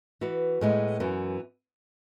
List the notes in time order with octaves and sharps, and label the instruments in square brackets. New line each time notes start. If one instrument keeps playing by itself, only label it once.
[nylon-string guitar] E3 B3 F#4 B4
A2 G#3 B3
F#2 E3 B3